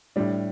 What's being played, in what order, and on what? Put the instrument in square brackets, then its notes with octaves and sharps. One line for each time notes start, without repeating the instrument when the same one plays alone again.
[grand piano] A2 G3 D4